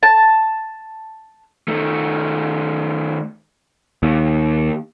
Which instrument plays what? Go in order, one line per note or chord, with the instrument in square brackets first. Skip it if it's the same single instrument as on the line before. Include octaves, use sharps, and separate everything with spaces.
[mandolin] A5
[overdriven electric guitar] D#3 A3
[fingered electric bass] D#2